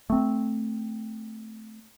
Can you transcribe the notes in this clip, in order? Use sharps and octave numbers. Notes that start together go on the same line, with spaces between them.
A3 C4